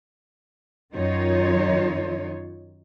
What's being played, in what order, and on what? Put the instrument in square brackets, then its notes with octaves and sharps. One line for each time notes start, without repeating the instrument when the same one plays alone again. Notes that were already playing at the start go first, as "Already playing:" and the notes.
[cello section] F#2 D#3 D#4 F4 C#5